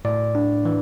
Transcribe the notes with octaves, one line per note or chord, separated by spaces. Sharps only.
A2 D5
D4
E3